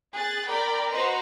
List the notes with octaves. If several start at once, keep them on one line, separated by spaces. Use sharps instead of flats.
G#4 F#6 A6
A#4 D5 G5 B5
F#4 B4 C5 D#5 A#5 C6